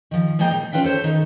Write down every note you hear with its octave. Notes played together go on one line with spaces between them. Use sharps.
D#3 F3
F3 G#3 A#3 G5 A#5
A#2
C#4 D4 F4 B4 F5 G5
A4 C5 C#5 A5
D#3 D#4